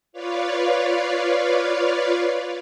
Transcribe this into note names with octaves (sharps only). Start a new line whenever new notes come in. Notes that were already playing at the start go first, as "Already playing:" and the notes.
F4 B4 C#5 D5 F5